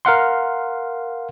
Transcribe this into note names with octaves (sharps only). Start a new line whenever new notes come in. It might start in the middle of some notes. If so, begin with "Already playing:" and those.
A#4 F5 F#5 C6